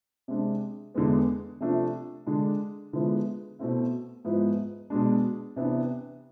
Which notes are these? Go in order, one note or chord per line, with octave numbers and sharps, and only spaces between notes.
C3 G#3 D4
E2 D3 G#3 B3
C3 F3 A3 D4
D3 G#3 D4
D3 F3 G#3 B3 E4
B2 A3 C4 E4
G#2 F3 B3 E4
B2 G#3 D4
C3 E3 B3 D4